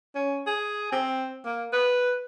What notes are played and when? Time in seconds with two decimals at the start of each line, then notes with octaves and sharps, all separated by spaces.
0.15 C#4
0.47 G#4
0.92 C4
1.46 A#3
1.73 B4